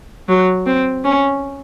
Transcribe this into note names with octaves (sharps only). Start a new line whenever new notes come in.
F#3
C4
C#4